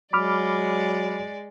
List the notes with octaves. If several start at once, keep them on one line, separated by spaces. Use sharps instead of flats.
F#3 G#3 D5 B5 D6 F6